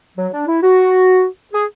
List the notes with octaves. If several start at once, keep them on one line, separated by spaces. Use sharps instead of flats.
F#3
D4
E4
F#4
G#4